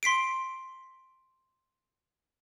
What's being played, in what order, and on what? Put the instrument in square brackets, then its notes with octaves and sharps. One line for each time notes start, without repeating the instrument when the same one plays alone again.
[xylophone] C6 B6 C7 D7